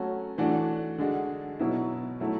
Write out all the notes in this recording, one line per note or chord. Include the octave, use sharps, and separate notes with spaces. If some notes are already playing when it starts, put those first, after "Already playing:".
Already playing: F#3 A3 C#4 F#4
E3 A3 D4 F#4
D3 G#3 D4 F#4
B2 F#3 B3 E4
F#3 A3 E4